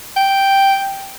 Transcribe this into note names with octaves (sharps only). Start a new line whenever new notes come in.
G5